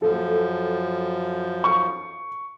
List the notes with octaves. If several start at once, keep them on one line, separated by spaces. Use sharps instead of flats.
F#2 F3 A4
C#6